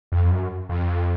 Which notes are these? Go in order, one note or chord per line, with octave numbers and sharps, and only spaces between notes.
F2
F#2
F2